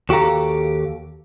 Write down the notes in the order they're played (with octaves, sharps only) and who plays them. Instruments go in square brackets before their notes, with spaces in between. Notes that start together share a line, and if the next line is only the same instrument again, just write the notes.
[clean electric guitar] D#2 F#4 G4 A4 F5 A#5